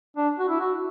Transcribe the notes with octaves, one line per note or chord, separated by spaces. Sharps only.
D4
F#4
E4
F#4